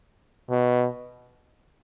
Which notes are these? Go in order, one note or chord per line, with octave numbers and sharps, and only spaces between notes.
B2